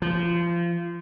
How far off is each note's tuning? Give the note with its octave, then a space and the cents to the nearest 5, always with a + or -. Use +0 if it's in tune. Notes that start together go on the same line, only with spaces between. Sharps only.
F3 -25